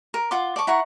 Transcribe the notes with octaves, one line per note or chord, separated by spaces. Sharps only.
A#4
F4 F#5 C6 D6
D5 A5 C#6
E4 F#5 A#5 C#6